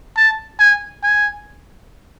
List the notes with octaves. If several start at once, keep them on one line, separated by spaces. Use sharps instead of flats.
A5
G#5
G#5